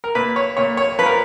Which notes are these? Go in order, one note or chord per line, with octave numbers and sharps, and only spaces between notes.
A#4
A#2 B4
C#5
A#2 C#5
C#5
F3 B4
A#4